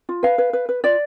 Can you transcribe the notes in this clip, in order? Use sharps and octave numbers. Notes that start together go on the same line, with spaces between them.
F4
B4 F5
B4
B4
B4
F4 D5